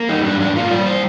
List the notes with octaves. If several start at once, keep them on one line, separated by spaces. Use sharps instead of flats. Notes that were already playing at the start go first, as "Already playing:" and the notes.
Already playing: A#3
G3 D#4
G#2 D4
G#2 D4
A#3 F4
G3 D5
C5